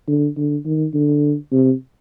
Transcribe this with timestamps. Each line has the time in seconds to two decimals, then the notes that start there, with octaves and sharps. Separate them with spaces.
0.08 D3
0.37 D3
0.65 D#3
0.94 D3
1.52 C3